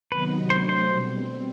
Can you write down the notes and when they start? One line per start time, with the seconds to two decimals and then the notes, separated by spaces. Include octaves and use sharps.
0.12 C3 D#3 F#3 B3 D#4 B4
0.49 F#3 A3 D4 C5
0.69 C5
0.88 B2 G3 C4